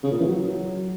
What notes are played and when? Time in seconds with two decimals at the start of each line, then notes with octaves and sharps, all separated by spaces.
0.03 C#3
0.12 A#2
0.20 E3
0.28 F#3